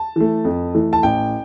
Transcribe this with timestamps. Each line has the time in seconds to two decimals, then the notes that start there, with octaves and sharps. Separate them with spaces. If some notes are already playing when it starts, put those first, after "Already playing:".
Already playing: A5
0.16 E3 A3
0.45 F2
0.74 E3 A3
0.93 A5
1.03 A1 G5